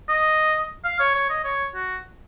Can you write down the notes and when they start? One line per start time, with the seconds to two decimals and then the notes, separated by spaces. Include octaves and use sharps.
0.09 D#5
0.84 F5
0.99 C#5
1.15 C#5
1.30 D#5
1.44 C#5
1.75 F#4